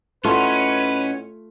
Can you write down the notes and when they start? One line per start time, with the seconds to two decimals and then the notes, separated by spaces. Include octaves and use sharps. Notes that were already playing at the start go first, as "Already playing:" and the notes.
0.25 A2 A3 C#4 F4 B4 D#5 F#5